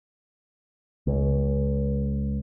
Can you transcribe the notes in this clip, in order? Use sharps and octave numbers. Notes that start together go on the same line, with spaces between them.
C#2